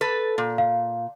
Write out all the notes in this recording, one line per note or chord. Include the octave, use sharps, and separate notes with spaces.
A4 B4
A#2
F5